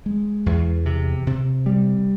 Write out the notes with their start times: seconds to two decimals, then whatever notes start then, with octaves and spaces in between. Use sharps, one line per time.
0.06 G#3
0.46 E2
0.86 C3
1.27 C3
1.66 G3